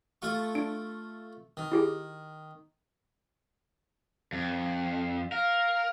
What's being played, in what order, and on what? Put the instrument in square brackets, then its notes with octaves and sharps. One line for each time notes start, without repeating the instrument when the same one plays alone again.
[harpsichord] A3 F4 C#6
[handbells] D4 D7
[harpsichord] D#3
[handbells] E4 G4 G#4
[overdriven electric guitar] F2
[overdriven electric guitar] A#4 [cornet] F5